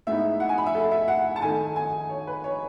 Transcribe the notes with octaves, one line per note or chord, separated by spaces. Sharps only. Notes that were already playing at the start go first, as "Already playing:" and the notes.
A2 G#3 B3 D#4 E5
F#5
G#5
B5
E5
A4
E5
F#5
A5
D#3 A3 D#4 G#5
G#5
C#5
B4
C#5